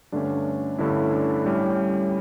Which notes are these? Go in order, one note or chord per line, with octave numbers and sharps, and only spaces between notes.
G2 D3 A3 C#4 D4
G2 D3 A3 C#4 E4
D4
A2 G3 C#4 G4